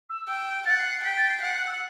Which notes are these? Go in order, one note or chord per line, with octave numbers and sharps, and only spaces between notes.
E6
G5
F#5 A6
C7
C7
G5 B6
A6
C7
F#5 C7
F#6
E6